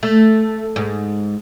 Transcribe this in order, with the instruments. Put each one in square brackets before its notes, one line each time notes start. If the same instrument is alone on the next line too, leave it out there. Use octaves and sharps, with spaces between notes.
[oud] A3
G#2